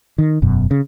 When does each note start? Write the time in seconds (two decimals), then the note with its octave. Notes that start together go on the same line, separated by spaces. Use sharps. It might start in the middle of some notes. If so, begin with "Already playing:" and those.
0.18 D#3
0.42 E1 F#2 B2
0.71 C#3